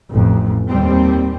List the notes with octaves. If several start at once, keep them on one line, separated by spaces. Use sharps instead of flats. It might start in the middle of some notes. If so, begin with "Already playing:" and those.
A1 F2
D#2 G3 C4